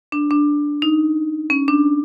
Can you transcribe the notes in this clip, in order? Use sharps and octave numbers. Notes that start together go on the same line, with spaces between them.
D4
D4
D#4
C#4
D4